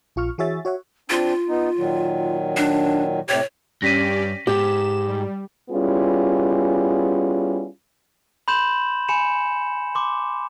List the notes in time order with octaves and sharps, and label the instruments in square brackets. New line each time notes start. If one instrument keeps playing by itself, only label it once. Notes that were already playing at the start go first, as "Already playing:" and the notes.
[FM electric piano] A#1 F4 C#6 F6
E3 F#4 G#4 C#5 E5 A6
F#4 C#5 E5 F#5
[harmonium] C4 D4 [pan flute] F4
[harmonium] B3 D#4
A#2 D#3 F#3
[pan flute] D4
[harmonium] A2 C3 G4 [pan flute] C#5
[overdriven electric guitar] G2 [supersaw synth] C#4 G4 D5 [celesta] A#6 B6 D#7
[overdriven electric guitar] G#2 [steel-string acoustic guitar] G4 [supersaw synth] E7
[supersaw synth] G3
[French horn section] G3 B3 C#4 E4 F4 G#4
[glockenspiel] B5 C6 G6 E7 F#7
G#5 B5 C#7 E7
C6 D6